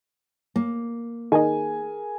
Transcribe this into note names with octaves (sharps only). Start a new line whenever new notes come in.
A#3
D#3 D#4 G#4 A#4 G#5